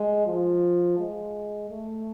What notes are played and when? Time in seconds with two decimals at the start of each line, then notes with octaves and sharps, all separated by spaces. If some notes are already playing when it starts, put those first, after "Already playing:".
Already playing: G#3
0.26 F3
0.98 G#3
1.70 A3